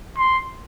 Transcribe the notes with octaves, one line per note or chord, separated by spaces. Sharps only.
C6